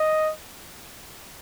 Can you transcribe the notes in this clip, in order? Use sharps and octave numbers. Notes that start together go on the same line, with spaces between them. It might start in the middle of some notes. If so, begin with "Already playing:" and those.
Already playing: D#5